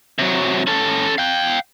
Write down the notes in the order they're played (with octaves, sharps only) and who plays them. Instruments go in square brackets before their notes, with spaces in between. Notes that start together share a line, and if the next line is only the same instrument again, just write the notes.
[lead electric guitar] C3 F#3
C#4 A4
F5 G5